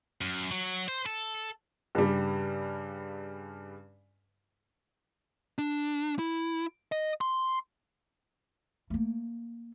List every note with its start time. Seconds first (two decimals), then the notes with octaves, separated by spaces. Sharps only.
0.21 F#2
0.51 F#3
0.88 C5
1.06 A4
1.95 G2 C#3 G3
5.58 D4
6.19 E4
6.92 D#5
7.21 C6
8.90 A3 A#3